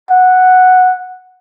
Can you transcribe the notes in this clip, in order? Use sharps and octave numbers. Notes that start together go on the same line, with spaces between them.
F#5